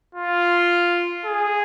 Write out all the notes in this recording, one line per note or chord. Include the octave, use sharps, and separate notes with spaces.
F4
G#4